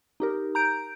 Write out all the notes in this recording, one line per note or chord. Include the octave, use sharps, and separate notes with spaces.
D#4 G4 A#4
A#5 G6 D7